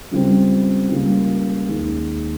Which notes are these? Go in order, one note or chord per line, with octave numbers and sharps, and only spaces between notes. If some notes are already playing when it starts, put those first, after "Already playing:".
C#2 C#3 G3 C4
C#2 C#3 G3 A#3
D#2 D#3 G#3